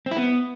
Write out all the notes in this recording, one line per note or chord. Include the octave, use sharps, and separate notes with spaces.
C4
E4
B3